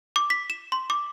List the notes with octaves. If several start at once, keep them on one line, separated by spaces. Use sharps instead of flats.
D6
B6
E7
C6
D6